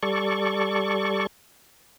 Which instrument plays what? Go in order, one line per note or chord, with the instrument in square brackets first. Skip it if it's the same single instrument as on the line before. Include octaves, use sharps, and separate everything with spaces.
[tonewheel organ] G3 A4 D5 C#6